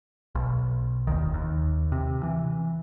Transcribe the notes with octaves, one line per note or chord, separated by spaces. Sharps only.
B1
F1 D#2 D#3
D#2
C3
E3